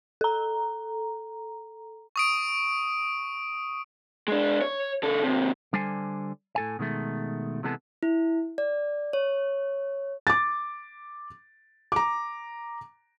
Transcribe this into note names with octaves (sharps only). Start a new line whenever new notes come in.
A4 A#5
C#6 D#6 D7
G#3 D4
C#5
C#3 A4
D#2 C3
D3 G3 A4 C5 G#5
A2 A4 G#5
B2 D#3 G#3 A3
C3 E3 G#3 B3 A4
E4
D5
C#5
D6 A6
A#5 D6